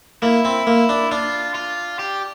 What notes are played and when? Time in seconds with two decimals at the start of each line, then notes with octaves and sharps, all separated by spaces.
0.22 A#3 E4
0.45 C4
0.67 A#3
0.89 D4
1.12 D4 F4
1.55 F4
1.99 G4